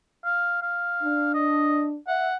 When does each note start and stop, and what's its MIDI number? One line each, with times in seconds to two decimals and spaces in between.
0.25 0.58 77
0.62 1.31 77
1.03 1.95 62
1.34 1.86 75
2.08 2.31 76
2.08 2.36 78